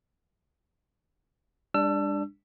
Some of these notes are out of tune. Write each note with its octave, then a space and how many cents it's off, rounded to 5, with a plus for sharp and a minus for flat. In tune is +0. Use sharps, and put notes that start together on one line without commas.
G3 +45 D4 +0 E6 +30